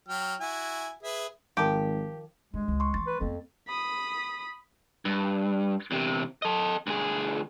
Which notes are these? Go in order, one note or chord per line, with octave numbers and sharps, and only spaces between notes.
F#3 G5 F6
E4 F#4 G#5
G#4 B4 E5
G#1 D#3 F3 G4
G2 G#3
C#2
C6 C#6
E3 A3 A6
B4
F2 A3 B3
B5 D#6
G2
E2 C3
A4 D#5
D2 G#4